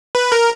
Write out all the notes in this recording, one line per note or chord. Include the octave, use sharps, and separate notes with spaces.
B4
A#4